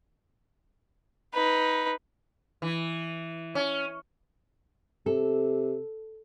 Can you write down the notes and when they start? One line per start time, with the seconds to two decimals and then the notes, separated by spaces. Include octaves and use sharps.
1.34 D#4 B4
2.62 E3
3.55 C#4
5.06 C3 A4